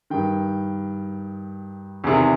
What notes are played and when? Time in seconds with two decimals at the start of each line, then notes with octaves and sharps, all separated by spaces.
0.10 G2 D#3 G5
2.04 E2 C3 D#3